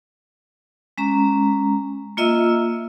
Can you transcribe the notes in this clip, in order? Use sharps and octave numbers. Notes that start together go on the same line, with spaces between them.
G#3 C#4 A#5
A#3 F4 D#5 E5 E6